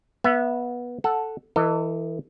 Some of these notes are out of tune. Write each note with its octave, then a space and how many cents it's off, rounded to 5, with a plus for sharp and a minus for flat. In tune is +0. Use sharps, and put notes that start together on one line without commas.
B3 -20 E5 +20
A4 +0 F#5 +0
E3 +0 A4 +40 D#5 -5